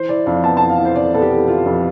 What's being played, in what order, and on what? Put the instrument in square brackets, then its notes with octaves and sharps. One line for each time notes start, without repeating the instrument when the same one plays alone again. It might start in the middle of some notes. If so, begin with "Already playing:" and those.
Already playing: [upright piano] E3 C5
E4 D5
F2 F5
B3 A5
E3 A5
F5
E4
C5
F2 D5
B3 A4
G4
E3
E4 F4
F2